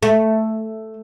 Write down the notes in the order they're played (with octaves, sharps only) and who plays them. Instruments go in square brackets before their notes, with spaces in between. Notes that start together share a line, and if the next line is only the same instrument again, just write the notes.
[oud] A3